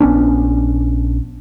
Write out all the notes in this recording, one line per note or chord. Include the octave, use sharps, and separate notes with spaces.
A#1 B3 C#4 D4